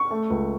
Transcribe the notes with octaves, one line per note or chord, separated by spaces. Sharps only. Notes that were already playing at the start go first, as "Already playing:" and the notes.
Already playing: C#6
A3
C#2